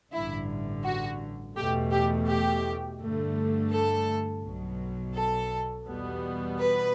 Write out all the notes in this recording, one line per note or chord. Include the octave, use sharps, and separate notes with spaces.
A1 G2 D3 E4
F#4
E2 B2 A3 G4
G4
G4
G2 D3 A3
A4
B1 B2 F#3
A4
E2 B2 G3 B3
B4